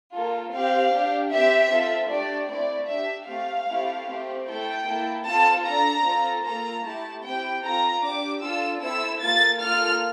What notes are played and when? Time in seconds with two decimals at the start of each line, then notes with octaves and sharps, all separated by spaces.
0.13 A#3 F4 A4
0.51 C4 G4 F5
0.91 D4 G4
1.30 C4 G4 E5
1.70 C4 F4 A4
2.10 A3 D4 G4 D5
2.49 A3 C4 E4 D5
2.88 D4 G4 E5
3.28 A3 C4 G4 F5
3.67 A3 C4 E4 G4
4.07 A3 C4 G4
4.46 A3 E4 A4 G5
4.86 A#3 E4 A4
5.25 C4 F4 A4 A5
5.65 D4 A4 A#5
6.05 C4 F4 A4
6.44 A#3 F4 A4 A#5
6.84 A3 E4 G4 A5
7.23 C4 E4 G4 G5
7.62 C4 F4 A4 A#5
8.02 D4 G4 D6
8.41 D4 F4 A4 E6
8.81 C4 E4 A4 E6
9.20 A#3 F4 A4 A6
9.60 A#3 F4 A4 F6